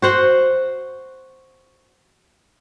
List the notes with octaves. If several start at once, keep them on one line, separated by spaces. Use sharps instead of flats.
F#4 C5 F#5